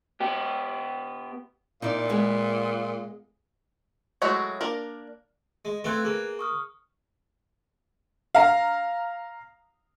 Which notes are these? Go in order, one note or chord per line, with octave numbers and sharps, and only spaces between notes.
B3 G4
A#2 D#4 E4 D5
G#3 B3 G#4
F#3 G#3 A3 E4 F#4
A#3 D4 A#4
G#3
A3 C4 F4 B4 F#6 G#6
A#3 G#4
C#6 D#6 F6
F5 A#5